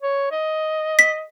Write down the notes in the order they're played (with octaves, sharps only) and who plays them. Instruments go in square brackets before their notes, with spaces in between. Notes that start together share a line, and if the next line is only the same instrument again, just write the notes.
[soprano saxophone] C#5
D#5
[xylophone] B6